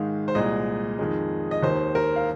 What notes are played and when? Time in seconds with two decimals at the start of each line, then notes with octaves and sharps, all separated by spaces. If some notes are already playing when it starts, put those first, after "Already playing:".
Already playing: G#2 D#3 G#3 F5
0.28 C5
0.35 C2 A#2 G#3 D#5
0.99 F2 D#3 G#3
1.51 D#5
1.63 D#2 D#3 A#3 C5
1.95 A#4
2.16 F5